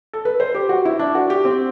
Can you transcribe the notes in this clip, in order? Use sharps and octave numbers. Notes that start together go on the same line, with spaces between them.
A4
B4
C5
G4
F#4
E4
D4
F#4
G4
C4